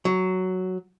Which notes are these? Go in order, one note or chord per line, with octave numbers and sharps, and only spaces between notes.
F#3